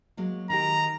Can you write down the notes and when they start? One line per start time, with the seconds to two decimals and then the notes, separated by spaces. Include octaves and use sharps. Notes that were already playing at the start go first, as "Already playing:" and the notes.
0.17 F#3 G#3 A#3
0.50 D#3 G4 A#5